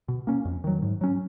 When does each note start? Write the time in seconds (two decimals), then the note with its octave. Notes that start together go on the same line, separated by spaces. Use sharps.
0.08 B2
0.27 A#3 C#4
0.45 F2
0.64 D#3 F#3
0.82 G#2
1.01 F#3 C#4